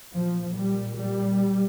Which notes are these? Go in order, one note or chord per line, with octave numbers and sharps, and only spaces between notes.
A#2 F3
G3
G3